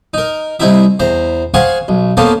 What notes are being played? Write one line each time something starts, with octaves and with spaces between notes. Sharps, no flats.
D#4 A#4
C2 C4 D#4 E4 E5
E2 C5 A#5
G#4 C5 F5 F#5 G#5 C#6
B1
A#3 B3 C#4 A4 C5 F5